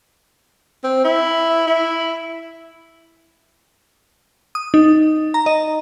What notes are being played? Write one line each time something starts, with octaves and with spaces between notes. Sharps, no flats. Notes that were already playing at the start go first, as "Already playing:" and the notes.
C4
E4
E4
D#6
D#4
A#5
D#5